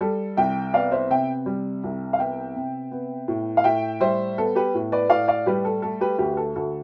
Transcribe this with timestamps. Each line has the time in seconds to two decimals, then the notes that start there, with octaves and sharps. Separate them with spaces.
0.01 G3 A4
0.37 C2 E5 G5
0.74 B3 D5 F5
0.91 C5 E5
1.10 C3 E5 G5
1.46 G3
1.84 C2
2.13 F5
2.19 B3 E5 G5
2.56 C3
2.91 B3
3.28 A2
3.57 F5
3.64 A2 E5 G5
4.01 G3 C5 E5
4.38 B3 A4
4.56 G4 B4
4.74 A2
4.92 B4 D5
5.10 A2 D5 F5
5.28 D5 F5
5.46 G3 G4 B4
5.65 A4
5.82 A3 A4
6.01 G4 B4
6.19 D2 G4 B4
6.33 B4
6.37 A4
6.56 D2 A4